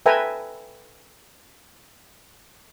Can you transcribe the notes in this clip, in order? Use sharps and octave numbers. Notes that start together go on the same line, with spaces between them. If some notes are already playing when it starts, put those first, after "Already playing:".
A4 B4 E5 G5 G#5 A#5